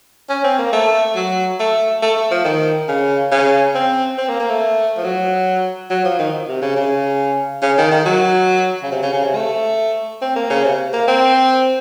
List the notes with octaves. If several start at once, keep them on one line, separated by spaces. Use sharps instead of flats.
C#4
C4
A#3
A3
F#3
A3
A3
A3
F3
D#3
C#3
C#3
C4
C4
A#3
A#3
A3
F3
F#3
F#3
F3
D#3
C3
C#3
C#3
C#3
D#3
D#3
F#3
C#3
C3
C#3
C#3
C3
A3
C4
A#3
C#3
C3
A#3
C4